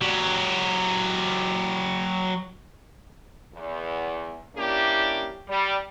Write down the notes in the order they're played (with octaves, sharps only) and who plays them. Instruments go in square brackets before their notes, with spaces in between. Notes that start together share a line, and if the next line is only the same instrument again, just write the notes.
[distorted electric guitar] F#3 G4
[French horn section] E2
A#3 C#4 D4 E4 G4
G3